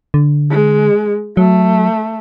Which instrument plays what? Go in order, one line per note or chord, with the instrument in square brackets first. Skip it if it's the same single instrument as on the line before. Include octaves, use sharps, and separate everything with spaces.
[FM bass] D3
[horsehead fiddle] G#3
[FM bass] F#3 [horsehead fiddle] A3